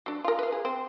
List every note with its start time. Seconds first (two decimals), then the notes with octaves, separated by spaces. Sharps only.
0.06 F#3 D4
0.24 F4 A#4
0.39 B4 F5
0.52 G#4
0.65 C4